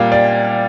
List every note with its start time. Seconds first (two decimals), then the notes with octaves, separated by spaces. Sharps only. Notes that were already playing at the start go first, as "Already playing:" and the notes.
Already playing: A#2 G3 A#3 F5 G5
0.12 D5